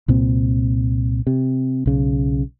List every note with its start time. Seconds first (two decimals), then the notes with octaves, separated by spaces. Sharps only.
0.08 C2 A#2 C4
1.27 C3
1.86 B1 C#3